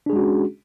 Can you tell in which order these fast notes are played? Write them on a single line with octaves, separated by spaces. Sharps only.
D4 G#4 G#3 F#4 C#4